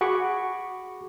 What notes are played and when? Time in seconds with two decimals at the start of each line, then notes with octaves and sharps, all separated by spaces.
0.01 F#4 G#4 B5 C#6 D6